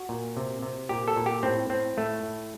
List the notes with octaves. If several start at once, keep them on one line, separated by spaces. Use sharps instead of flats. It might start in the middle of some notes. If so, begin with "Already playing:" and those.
Already playing: F#4
A#2
C3
C3
A#2 G4
A4
A#2
G4
A2 C4
A2 C4
A2 A3
A2